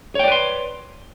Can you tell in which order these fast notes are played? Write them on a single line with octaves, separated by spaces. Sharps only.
C#5 G5 D5 B4 C6